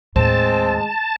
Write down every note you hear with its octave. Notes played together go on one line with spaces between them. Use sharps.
D#2 A2 G#3 C4 A5